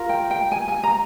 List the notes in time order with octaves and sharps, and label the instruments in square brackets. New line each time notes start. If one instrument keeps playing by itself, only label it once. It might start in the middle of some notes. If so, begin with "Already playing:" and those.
Already playing: [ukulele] F4 A#4
G5
G5
G#5
G#5
A#5